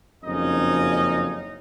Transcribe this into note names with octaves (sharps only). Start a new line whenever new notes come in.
F#1 F2 C#4 D#4 D#5